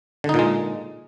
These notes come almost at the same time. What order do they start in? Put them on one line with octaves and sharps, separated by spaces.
D3 D#4 A#2 G#3